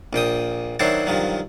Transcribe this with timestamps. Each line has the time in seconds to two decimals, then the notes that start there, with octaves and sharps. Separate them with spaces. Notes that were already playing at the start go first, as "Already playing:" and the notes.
0.13 A#1 A#2 G5 D#6
0.80 D#3 F#3 D4 E4 C5 C#5
1.07 G2 D#3 F3 F#3